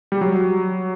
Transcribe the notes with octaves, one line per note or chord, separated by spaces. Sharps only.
G3
F#3